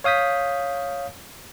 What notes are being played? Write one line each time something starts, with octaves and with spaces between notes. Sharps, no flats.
C#5 F5 D#6 G6 B6